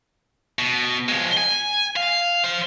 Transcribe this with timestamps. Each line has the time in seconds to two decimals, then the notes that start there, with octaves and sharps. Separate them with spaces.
0.59 B2
1.09 F3 G#3
1.37 G#5
1.96 F5
2.44 C5 F5